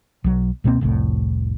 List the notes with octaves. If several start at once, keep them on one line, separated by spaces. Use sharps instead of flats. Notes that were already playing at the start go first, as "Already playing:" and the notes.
B1 F#3
C#2 B2 A#3 C4
F1 C2 A2